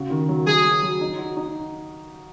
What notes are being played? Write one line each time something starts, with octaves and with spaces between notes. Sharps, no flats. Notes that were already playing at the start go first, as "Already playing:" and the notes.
Already playing: C#3 F#4
D#3
F#3
F#3 G#4
F#3
F#3
D#4
F#4
D#4